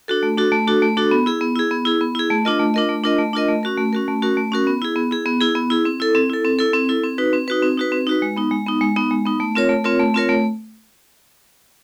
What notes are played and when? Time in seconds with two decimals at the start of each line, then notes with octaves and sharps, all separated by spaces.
0.08 D4 F#4 A4
0.23 A3
0.38 D4 F#4 A4
0.52 A3
0.67 D4 F#4 A4
0.82 A3
0.97 D4 F#4 A4
1.11 B3
1.26 E4 G#4
1.41 B3
1.56 E4 G#4
1.71 B3
1.85 E4 G#4
2.01 B3
2.15 E4 G#4
2.30 A3
2.45 D4 F4 A#4 D#5
2.59 A3
2.74 D4 F4 A#4 D#5
2.89 A3
3.04 D4 F4 A#4 D#5
3.19 A3
3.33 D4 F4 A#4 D#5
3.49 A3
3.63 C#4 F#4 A#4
3.77 A3
3.93 C#4 F#4 A#4
4.08 A3
4.22 C#4 F#4 A#4
4.37 A3
4.52 C#4 F#4 A#4
4.67 B3
4.82 E4 G#4
4.96 B3
5.11 E4 G#4
5.26 B3
5.41 E4 G#4
5.55 B3
5.70 E4 G#4
5.85 C4
6.00 E4 A4
6.15 C4
6.30 E4 A4
6.44 C4
6.59 E4 A4
6.73 C4
6.89 E4 A4
7.04 C4
7.18 D#4 F#4 B4
7.33 C4
7.48 D#4 F#4 B4
7.62 C4
7.77 D#4 F#4 B4
7.92 C4
8.07 D#4 F#4 B4
8.22 G#3
8.37 B3 D#4
8.51 G#3
8.66 B3 D#4
8.81 G#3
8.96 B3 D#4
9.11 G#3
9.26 B3 D#4
9.40 A3
9.55 C4 F4 A#4 C#5
9.69 A3
9.84 C4 F4 A#4 C#5
10.00 A3
10.14 C4 F4 A#4 C#5
10.29 A3